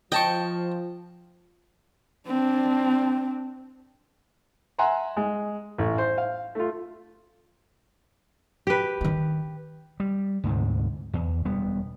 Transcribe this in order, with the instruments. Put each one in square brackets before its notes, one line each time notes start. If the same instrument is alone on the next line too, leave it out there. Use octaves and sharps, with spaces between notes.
[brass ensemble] F3 [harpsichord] D#5 A5 C#6 [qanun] G5
[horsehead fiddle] C4 D4
[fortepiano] E5 F#5 G#5 A#5 C6
G#3
A1
C5
F5
A3 F4
[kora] G4 B4
[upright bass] D#3 D#4
[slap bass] G3
D2 G#2 C3
E2
E1 G3 B3